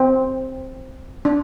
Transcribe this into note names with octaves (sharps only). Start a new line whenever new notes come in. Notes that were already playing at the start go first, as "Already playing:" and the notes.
Already playing: C4
D4